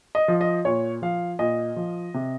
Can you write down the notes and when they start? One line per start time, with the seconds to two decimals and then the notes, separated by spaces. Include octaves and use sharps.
0.15 D#5
0.28 F3
0.41 D#5
0.65 A#2 C#5
1.02 F3 F5
1.39 A#2 D#5
1.76 F3
2.14 C3